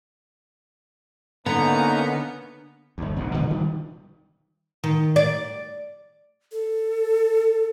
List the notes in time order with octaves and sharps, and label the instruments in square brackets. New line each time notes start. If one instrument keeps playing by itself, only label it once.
[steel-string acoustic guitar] D3 [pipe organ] A#3 C#4 D#4 [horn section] B3 [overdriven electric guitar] A#5
[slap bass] G1 D2
F1 B1 E2 B2
A#2 D3 G#3 B3
D#3 G3
[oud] D#3
D5
[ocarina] A4